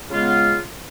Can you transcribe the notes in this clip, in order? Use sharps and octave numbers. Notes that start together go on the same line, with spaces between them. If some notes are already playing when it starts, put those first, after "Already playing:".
C#3 G#3 B3 F4